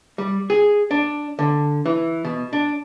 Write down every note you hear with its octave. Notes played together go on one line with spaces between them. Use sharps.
G3
G#4
D4
D3
E3
B2
D4